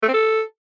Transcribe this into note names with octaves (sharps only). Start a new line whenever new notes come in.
A3
C4
A4